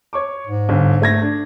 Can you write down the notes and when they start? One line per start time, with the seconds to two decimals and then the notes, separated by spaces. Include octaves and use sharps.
0.13 C#5 C#6 D6
0.47 G#2
0.69 G1
1.02 A3 G#6 A#6
1.22 D4